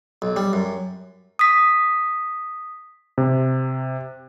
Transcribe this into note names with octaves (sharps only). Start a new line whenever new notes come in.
B1
G3
F#2
D#6 B6
C3